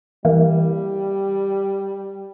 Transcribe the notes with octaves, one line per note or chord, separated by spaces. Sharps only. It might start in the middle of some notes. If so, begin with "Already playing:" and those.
E3 G3 A#3